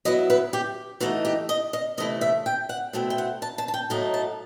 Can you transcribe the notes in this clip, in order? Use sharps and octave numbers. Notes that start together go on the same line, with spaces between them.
F#3 B3 E4 D#5
B4
G4
E3 A3 D#4 F#4
G4
D#5
D#5
C3 E3 A3 E4 D#5
E5
G5
F#5
B2 A3 C4 E4
G5
F#5
A5
A5
A5
G5
A2 F#3 A3 D#4 A5
A5